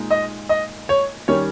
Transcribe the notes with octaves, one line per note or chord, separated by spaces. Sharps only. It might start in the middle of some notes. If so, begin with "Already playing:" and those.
Already playing: A#2 G#3 D#4
D#5
D#5
C#5
D#3 G3 C#4 C#5